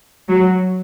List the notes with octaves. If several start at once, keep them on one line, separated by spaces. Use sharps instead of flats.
F#3